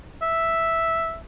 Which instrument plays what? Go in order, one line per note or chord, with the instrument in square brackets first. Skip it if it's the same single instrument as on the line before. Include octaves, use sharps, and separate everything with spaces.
[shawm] E5